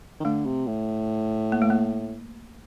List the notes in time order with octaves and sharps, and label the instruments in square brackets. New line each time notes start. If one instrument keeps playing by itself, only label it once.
[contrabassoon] D#3
[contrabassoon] D3 [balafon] A3
[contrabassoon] C3
A2
[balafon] A#3
A3
A#3